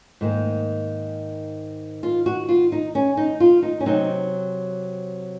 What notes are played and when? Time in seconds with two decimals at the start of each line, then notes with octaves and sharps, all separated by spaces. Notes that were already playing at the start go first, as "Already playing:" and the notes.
0.21 G#2 D#3 A#3
2.03 F4
2.26 F#4
2.49 F4
2.72 D#4
2.95 C#4
3.17 D#4
3.40 F4
3.63 D#4
3.80 C#4
3.86 C3 F#3 C4 D#4